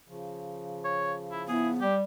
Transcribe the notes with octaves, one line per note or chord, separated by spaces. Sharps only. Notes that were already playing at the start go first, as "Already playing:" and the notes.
C#3 F3
C#5
E4
B3 E4 G#4
G3 G4